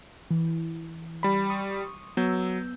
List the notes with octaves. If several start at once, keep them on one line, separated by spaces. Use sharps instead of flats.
E3
G3 B5
C6 C#6 D#6
F#3 B3 E6 G6